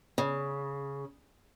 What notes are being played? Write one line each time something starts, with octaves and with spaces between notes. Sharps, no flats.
C#3